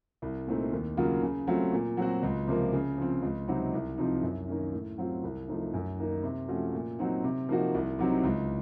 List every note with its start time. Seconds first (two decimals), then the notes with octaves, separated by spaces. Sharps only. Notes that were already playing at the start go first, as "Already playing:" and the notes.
0.22 C2
0.47 A#2 A3 C4 D#4
0.73 D#2
0.97 C#3 F#3 A#3 F4
1.23 C#3
1.47 F#3 A3 C4 F4
1.72 A#2
1.97 F#3 C4 F#4
2.23 C#2
2.47 C3 F3 A#3
2.73 C#3
2.98 F3 C4
3.22 C#2
3.48 C3 F#3 C4 D#4
3.73 C2
3.98 C3 F3 C4 D#4
4.23 F#2
4.48 D#3 A#3 C#4
4.73 A2
4.98 F#3 C4 F4
5.23 C2
5.48 C3 F3 A3 D#4
5.74 F#2
5.98 D#3 A#3 D#4
6.23 C3
6.48 F3 A3 C#4 F#4
6.74 A#2
6.99 F#3 C4 D#4
7.24 C3
7.49 F3 A#3 D#4 F#4
7.74 C2
7.99 C3 F#3 C4 D#4
8.23 C#2